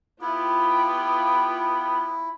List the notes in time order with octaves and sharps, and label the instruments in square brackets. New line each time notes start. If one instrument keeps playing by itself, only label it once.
[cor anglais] B3 [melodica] E4 [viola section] F4 G4 G5